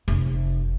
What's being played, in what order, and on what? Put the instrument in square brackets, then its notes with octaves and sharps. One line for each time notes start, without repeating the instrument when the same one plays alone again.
[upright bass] F1